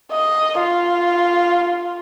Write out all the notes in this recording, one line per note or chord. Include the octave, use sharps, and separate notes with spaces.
D#5
F4